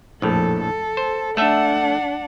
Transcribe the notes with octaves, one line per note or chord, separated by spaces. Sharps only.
A#1 F2 A2 A4
A4
C5
A3 D4 A4 E5 F#5